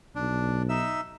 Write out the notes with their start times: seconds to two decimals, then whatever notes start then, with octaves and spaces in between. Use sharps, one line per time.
0.15 B1 D4
0.69 D#4 E5 E6